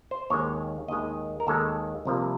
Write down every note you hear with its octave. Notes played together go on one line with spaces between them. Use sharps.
C5
D#2 D#3 G#3 C#5
D#2 D#3 G#3 D#5
A#4
D#2 D#3 G#3 A4
C2 C3 F3 A#3